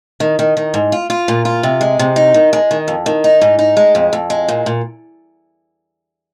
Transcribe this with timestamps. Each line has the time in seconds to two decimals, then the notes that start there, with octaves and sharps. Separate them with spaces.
0.20 D#3
0.39 D#3
0.57 D#3
0.74 G#2
0.92 F4
1.10 F4
1.28 A#2
1.45 F4
1.63 C3
1.81 G#3
1.99 C3
2.16 D#4
2.34 D#3
2.53 G#3
2.71 D#3
2.88 F2
3.06 D#3
3.24 D#4
3.41 G#2
3.59 D#4
3.77 G#3
3.95 F2
4.13 F2
4.30 G#3
4.48 A#2
4.66 A#2